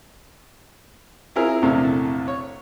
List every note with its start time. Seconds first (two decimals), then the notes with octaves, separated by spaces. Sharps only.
1.36 C4 E4 F4 G#4 A#4
1.62 A#1 E2 C3 A3
2.28 C#5